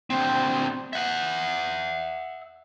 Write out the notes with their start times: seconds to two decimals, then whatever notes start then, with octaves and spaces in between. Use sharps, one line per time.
0.10 D2 C4
0.93 E5 F#5